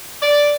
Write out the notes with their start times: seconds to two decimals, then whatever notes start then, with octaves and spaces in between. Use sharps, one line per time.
0.21 D5